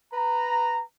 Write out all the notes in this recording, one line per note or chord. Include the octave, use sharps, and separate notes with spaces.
B4 A#5